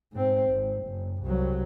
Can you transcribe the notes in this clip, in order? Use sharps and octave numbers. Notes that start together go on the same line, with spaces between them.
G#2 C4
G#1
F#1
C2 F#3